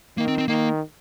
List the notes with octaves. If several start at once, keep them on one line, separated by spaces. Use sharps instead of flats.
D#3 A#3
C4
C4
D#3 A#3